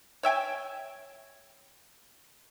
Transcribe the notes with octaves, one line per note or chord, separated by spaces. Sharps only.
C#5 E5 G5 G#5